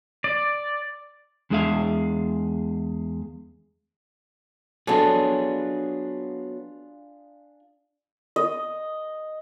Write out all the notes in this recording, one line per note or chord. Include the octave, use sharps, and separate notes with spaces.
D5
E2 G#3 D4 G#4 E5 F5
F#3 B3 D4 F4 G#4 A4 C#5 A5
D#5